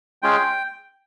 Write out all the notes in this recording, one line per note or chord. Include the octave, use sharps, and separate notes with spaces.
G#3 C#4 F4 G#4 G5